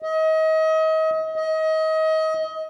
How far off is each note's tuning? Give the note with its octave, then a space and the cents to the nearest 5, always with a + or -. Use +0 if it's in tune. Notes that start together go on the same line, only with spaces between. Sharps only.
D#5 +35
D#5 +30